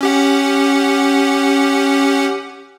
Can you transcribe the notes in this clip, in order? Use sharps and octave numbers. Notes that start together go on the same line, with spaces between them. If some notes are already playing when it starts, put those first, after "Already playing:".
C#4 G4 F#5